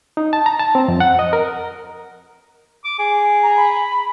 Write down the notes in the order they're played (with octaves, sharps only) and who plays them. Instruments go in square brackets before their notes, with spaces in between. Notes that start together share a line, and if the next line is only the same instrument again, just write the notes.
[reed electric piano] D#4
A5
A#5
A5
C4
F2
F#5
D#5
A#4
[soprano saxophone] D6
G#4
[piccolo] A#5
B5